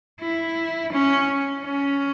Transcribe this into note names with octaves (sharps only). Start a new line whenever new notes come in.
E4
C#4
C#4